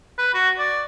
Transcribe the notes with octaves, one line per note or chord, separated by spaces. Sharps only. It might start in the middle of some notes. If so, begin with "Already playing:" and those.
B4
F#4
D5